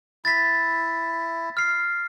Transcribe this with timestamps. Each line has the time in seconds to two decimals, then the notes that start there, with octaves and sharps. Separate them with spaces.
0.25 E4 A6 B6
1.57 F6 C7